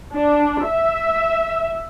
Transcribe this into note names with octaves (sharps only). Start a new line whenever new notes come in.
D4
E5